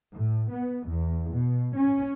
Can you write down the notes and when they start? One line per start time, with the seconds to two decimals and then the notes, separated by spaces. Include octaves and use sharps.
0.13 A2
0.51 B3
0.88 E2
1.32 B2
1.76 C#4